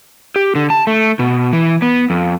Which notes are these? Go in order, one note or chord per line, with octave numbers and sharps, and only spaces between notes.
G4
D3
A5
A3
B2
E3
B3
F2